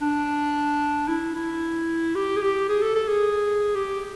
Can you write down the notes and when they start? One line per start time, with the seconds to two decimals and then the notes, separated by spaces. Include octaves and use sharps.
0.01 D4
1.08 E4
1.35 E4
2.15 G4
2.36 G#4
2.41 G4
2.69 G#4
2.82 A4
2.95 A4
3.08 G#4
3.75 G4